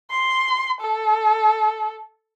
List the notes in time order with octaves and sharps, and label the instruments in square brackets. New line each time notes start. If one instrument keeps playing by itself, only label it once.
[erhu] C6
A4